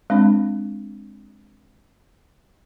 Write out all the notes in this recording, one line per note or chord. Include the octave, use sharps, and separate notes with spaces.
G#3 C4 D4